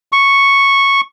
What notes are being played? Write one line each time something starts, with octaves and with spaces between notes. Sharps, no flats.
C#6